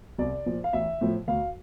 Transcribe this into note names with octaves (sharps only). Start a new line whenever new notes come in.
C2 D5
A#2 F3
F5
A1 E5
A2 F3
D2 F5